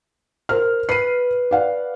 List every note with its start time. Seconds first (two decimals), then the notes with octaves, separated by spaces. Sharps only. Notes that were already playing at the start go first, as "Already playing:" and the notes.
0.49 A#4 C5 F6
0.89 B4 C7 D#7
1.51 D5 F5 F#5